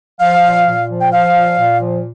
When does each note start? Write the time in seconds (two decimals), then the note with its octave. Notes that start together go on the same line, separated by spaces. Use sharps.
0.19 F3 F5
0.43 A#2
0.66 A#2
0.89 F3
1.01 G5
1.12 F3 F5
1.35 A#2
1.58 A#2
1.80 F3